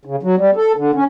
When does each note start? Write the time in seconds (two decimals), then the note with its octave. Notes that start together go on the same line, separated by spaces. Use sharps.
0.05 C#3
0.23 F#3
0.38 G3
0.56 A4
0.76 D3
0.95 C#4